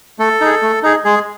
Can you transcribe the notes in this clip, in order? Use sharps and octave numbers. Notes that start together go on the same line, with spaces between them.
A3 A4
D#4 G#4
A3
D#4 G#4
G#3 G#4